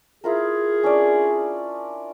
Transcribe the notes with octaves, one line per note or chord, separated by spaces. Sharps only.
E4 F4 G#4 A#4
C#4 D4 D5